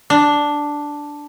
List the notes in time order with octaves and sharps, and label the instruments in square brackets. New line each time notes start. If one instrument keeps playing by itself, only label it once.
[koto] D4